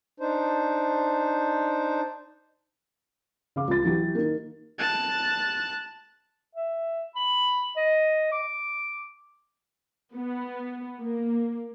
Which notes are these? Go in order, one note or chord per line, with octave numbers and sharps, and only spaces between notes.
D4 D#4 C5
C#3 F5 D6
C#2 A6
E3 F#3 E4 G4
D#3 A#3
A5 F#6
E5
B5
D#5
D6
B3
A#3